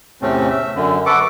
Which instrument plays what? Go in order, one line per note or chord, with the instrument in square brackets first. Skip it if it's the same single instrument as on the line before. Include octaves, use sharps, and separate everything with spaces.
[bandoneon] E2 A2 C3 A3 C4 C#4
E5
F#2 D3
F#4 A4 B4 F#5 D6